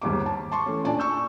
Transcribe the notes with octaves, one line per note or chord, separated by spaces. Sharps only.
G1 D#2 G#2 D6
A5
A5 C6 C#6
E3 A3 C#4
A#2 D4 D5 G#5 A5
C#6 E6 G6